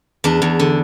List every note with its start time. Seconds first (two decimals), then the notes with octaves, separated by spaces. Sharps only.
0.24 E2 D4
0.42 E2
0.60 D3